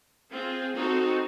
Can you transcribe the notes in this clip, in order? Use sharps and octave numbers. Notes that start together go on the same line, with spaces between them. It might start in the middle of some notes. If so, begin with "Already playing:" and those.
C4 F4 G#4
C4 D#4 F#4 A4